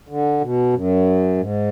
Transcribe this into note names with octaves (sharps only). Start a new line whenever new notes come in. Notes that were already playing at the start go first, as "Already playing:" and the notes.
D3
B2
F#2
G#2